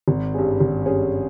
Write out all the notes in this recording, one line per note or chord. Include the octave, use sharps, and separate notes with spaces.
G#1
G2 G3 C#4 G#4
G#1
G2 G3 C#4 G#4